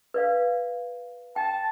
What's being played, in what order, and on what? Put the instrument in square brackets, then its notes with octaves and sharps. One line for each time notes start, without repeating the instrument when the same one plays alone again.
[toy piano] B4 D5 F5
[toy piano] G5 [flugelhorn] A5